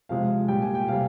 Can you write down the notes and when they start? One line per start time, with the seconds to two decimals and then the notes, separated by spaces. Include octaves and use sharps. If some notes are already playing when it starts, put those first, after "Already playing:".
0.09 C3 F3 G#3 F5
0.48 A#2 G3 G5
0.62 G#5
0.75 G5
0.88 C3 G3 F5